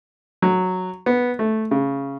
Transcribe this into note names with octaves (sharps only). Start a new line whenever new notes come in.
F#3
B3
A3
C#3